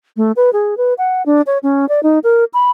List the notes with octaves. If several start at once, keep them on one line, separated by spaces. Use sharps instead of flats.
A3
B4
G#4
B4
F#5
D4
C#5
C#4
D5
D#4
A#4
B5